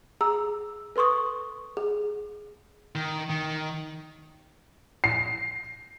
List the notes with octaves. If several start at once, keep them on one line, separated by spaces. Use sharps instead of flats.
G#4 A#5 E6
A4 B4 C6 C#6 D#6
G#4
D#3
D#3
C7